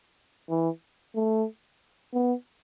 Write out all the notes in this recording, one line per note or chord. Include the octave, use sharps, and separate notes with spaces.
E3
A3
B3